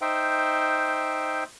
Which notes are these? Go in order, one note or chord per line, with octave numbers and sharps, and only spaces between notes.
D#4 C5 E5 G5